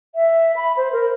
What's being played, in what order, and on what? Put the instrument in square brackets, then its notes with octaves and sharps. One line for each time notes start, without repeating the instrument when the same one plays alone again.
[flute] E5
B5
C5
A#4